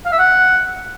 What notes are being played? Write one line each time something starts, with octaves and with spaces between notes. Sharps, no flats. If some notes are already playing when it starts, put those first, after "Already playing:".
F5
E5
F#5